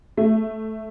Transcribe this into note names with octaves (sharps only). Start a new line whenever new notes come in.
A3